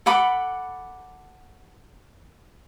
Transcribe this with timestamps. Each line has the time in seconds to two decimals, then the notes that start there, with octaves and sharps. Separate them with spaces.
0.06 A4 F#5 B5 D6